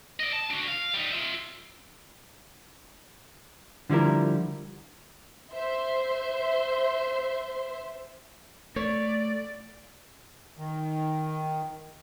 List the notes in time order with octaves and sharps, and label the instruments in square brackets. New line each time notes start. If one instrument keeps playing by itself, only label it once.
[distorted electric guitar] D5 D#5
A5
D4 F#4
F5
G3 D#4
F4 E5
[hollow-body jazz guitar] D3 F3 G3 E4 A#4
[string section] C5 E5 C6
[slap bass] A3 [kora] C#5 [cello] D5
[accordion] D#3